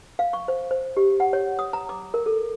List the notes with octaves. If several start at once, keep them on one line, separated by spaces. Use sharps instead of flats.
F5
C#6
C5
C5
G4
F#5
C#5
D#6
A#5
D6
A#4
A4